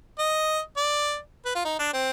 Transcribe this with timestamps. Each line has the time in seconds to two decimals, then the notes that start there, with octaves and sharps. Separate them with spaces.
0.19 D#5
0.77 D5
1.45 B4
1.55 F4
1.65 D#4
1.79 D4
1.93 C4